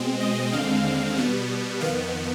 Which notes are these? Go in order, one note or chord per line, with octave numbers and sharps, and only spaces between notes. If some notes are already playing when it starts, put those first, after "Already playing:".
Already playing: B2 G#3 C4
D#5
D#2 D3 G#3 C4 F5
B2 G3 B3
F2 D#3 B3 F5